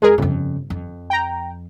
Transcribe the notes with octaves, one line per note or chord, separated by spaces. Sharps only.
F2 G#3 G#4 A#4
G1 F2 C#3
F2
G5 A#5